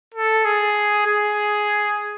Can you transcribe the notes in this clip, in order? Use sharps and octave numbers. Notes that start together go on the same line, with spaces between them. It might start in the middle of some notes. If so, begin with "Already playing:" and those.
A4
G#4
G#4